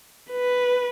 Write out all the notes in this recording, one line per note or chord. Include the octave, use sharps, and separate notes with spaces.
B4